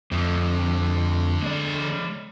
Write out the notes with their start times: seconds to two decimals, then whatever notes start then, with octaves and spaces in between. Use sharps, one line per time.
0.12 F2 D3 A3
1.42 G#3 D5